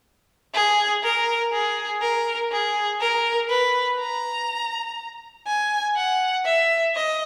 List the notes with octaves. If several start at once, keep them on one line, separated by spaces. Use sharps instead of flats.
G#4
A#4
G#4
A#4
G#4
A#4
B4
A#5
G#5
F#5
E5
D#5